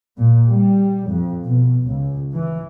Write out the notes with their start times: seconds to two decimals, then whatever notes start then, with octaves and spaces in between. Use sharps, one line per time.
0.18 A#2
0.49 G3
1.09 F2
1.45 B2
1.89 C#2
2.34 E3